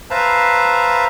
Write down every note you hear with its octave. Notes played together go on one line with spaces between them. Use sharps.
B4 C5 E5 F5 A5 A#5